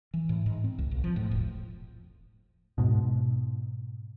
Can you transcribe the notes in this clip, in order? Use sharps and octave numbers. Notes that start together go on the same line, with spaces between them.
E3
A2
G#2
C4
C#2
B1
F3
A2
E1
G#2 B2